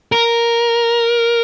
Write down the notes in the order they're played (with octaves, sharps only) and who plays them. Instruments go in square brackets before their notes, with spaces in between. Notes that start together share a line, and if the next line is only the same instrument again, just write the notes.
[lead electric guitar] A#4